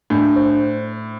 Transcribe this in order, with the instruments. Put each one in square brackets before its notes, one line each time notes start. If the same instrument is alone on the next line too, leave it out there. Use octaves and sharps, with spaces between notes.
[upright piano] A2 [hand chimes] D4
[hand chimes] C5